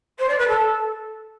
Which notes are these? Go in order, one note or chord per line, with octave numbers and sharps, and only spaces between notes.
C5
D5
B4
A4